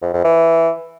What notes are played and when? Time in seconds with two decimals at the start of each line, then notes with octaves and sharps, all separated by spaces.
0.02 F2
0.13 F2
0.24 E3